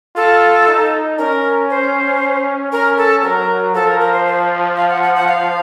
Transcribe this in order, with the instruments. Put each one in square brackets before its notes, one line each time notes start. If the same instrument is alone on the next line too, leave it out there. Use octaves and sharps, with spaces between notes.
[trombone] F4 [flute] A4
[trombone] D#4
[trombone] C#4 [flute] A#4
[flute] C5
[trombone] C#4 [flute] A#4
[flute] A4
[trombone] F#3 [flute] A#4
[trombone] F3 [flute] A4
[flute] A#4
A#4
C5
C5
F5
F#5
F#5
F#5
F5